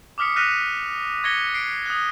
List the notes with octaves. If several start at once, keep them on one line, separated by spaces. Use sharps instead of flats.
D6 D#6 F6 B6 C#7
F6 F#6 A#6 B6 D#7 F7
C#6 G#6 A#6 B6 C#7 G7
C7 D7
D#6 F#6